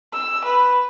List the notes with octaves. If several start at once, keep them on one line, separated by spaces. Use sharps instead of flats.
E6
B4